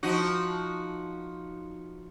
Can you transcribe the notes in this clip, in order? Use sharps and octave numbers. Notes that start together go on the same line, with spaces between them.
F3 D#4 F#4